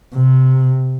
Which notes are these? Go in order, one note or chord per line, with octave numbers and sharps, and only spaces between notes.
C3